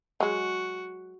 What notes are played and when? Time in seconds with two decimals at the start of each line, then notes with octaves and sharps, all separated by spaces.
0.20 F#3 G#3 F#4